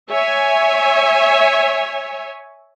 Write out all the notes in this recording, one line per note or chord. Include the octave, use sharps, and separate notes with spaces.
C#5 E5 G#5